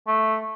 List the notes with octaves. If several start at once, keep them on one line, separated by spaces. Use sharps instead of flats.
A3